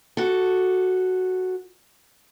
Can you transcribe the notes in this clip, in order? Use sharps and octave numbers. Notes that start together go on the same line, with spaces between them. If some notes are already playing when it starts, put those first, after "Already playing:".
F#4 A4